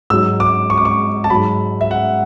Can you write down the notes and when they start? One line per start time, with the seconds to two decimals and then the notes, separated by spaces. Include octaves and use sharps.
0.10 G#2 F#3 E6
0.40 D6
0.70 C#6
0.78 D6
0.85 C#6
1.24 A5
1.30 G#2 F#3 B5
1.81 E5
1.91 F#5